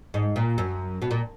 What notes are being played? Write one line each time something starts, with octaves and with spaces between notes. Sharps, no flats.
G#2
A#2
F#2
B2
A#2